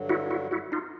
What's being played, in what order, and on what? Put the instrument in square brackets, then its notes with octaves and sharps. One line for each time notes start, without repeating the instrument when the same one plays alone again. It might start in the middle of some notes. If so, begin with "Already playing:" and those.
Already playing: [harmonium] G2 D3 F#3
[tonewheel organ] E4 F#4
E4 F#4
E4 F#4
D#4 F4